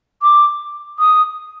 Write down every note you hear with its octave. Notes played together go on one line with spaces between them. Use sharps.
D6
D#6